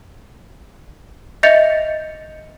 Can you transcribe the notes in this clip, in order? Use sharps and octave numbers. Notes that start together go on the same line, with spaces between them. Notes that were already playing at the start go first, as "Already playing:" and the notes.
D#5 E5 G6 A6 C#7 F7